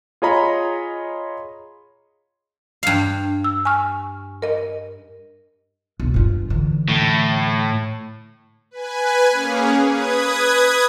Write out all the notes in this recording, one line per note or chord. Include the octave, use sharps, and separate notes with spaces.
F4 G#4 C#5 D#5 A#5 B5
G2 F5
E6
G#5 C#6 F6
A#4 D#5
B1
G2 F4
D3 E3
A2
B4 G#5
A#3 C#4 G#4
B4 D#6 G#6